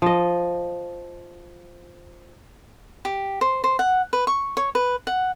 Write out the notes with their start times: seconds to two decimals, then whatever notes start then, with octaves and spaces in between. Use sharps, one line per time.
0.02 F3 D#5
3.05 G4
3.41 C5
3.64 C5
3.79 F#5
4.13 B4
4.27 C#6
4.57 C#5
4.75 B4
5.07 F#5